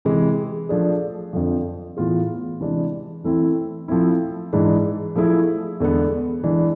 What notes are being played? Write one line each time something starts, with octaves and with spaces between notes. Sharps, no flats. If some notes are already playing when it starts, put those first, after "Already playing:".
C3 E3 G#3
F3 A3 D4 G#4
F2 D3 F3
A2 E3 B3 F4 G#4
C3 E3 G#3 D4 G#4
E3 A3 C4 E4
F3 A3 C4 E4
G#2 E3 G#3 D4
F3 A3 E4 G#4
E2 D3 G#3 B3
E3 G#3 D4